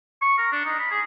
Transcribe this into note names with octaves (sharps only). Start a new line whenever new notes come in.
C#6
A#4
D4
D#4
B5
G#4